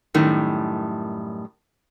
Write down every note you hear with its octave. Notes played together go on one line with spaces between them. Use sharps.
F#2 A2 D#3 G3